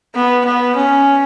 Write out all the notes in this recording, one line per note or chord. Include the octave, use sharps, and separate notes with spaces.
B3
B3
C#4